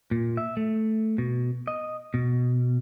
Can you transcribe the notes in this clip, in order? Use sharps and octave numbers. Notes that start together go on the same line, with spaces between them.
A#2
E5
A3
B2
D#5
B2